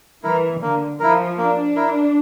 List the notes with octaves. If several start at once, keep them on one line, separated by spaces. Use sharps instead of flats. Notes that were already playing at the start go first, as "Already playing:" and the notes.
E3 E4 A#4
D3 A#3
F3 E4 A#4
A#3 D4
E4 A#4